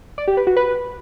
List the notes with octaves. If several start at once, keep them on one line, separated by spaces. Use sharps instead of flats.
D5
G4
B4
F#4
B4